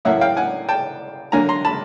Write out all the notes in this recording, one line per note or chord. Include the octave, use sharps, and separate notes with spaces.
A2 F#3 A#3 C#4 E4 E5 F#5
F5 G5
F#5 G#5
G5 A5
D3 F#3 A#3 D4 G#5 A#5
A#5 C6
A5 B5